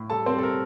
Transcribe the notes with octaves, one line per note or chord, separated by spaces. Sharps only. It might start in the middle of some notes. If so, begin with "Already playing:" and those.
Already playing: A2
G3 A4 A5
C4 C5
G3 A4
A#4